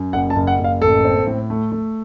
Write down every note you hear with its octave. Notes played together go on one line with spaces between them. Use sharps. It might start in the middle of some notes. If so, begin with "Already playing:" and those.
Already playing: F#2
F#1 F#5
A5
F#1
F#5
F#1
F5
A1 A4
C4
A2
A3
A3